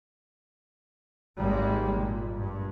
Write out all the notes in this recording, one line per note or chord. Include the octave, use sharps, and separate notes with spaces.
G#1 G3 G#3 A#3
A#2
G2